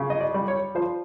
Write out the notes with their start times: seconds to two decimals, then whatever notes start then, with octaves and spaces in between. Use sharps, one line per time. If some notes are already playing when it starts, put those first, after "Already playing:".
Already playing: C#3
0.10 D#5
0.20 D5
0.34 G3
0.48 C#5
0.75 F3 C5